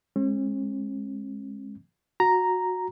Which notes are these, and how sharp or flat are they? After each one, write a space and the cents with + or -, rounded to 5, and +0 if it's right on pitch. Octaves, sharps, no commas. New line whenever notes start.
G#3 +0 C#4 -45
F#4 -15 A#5 +0